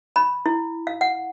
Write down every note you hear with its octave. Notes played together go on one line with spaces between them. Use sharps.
B5
E4
F5
F#5